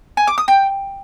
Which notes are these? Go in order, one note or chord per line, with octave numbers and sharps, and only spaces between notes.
G#5
D6
D#6
G5